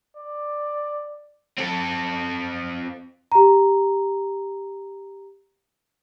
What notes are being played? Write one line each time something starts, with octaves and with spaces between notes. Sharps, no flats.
D5
C4 A4
G4 A#5